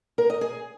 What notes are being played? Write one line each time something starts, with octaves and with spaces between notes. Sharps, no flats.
A#4
D#5
G#4